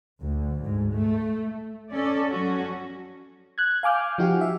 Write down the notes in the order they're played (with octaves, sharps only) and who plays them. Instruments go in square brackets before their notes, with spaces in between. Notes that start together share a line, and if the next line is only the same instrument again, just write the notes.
[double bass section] D2
G#2
A3
[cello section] C#4 A4 D5
F#3 C#4 F#4
[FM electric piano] F#6 G#6
F5 G#5 D6 F6 G6
F3 D#4 F#4 G4
E5